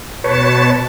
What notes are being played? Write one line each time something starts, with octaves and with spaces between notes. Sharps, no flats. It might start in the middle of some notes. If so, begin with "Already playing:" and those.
B2 B4 C#5 A5